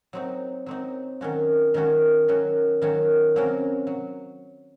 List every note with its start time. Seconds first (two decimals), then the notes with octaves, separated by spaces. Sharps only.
0.13 F#3 C4 D#4
0.66 F#3 C4 D#4
1.21 D#3 F#3 C#4 F#4
1.74 D#3 F#3 C#4 F#4
2.28 D#3 F#3 C#4 F#4
2.82 D#3 F#3 C#4 F#4
3.36 C3 F#3 C#4 F#4 A#4
3.87 F#3